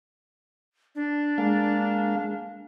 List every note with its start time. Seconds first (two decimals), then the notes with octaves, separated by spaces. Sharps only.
0.95 D4
1.38 G#3 A#3 F5